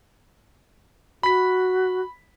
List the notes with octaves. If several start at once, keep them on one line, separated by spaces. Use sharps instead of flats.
F#4 B5 B6